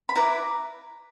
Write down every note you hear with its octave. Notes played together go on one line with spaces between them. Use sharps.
B5
E4 B4 D5 A#5